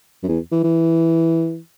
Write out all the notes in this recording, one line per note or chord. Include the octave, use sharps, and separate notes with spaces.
F#2
E2
E3
E3